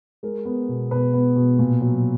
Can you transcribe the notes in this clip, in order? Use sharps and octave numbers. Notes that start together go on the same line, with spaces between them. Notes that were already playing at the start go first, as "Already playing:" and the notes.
G#3 A#4
B3
B2
B2 B4
B3
B2
A#2
F#3